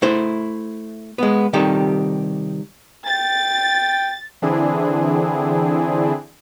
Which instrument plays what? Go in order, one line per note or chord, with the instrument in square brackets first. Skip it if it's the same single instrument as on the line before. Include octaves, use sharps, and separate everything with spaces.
[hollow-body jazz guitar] A3 E4 C5
G#3 B3
C3 D#3 G3 G4 A4
[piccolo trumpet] G5 [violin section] A6
[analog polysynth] D3 E3 C4 D4 E4 G#4